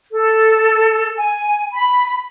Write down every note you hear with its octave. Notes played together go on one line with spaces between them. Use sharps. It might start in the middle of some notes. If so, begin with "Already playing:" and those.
A4
G#5
B5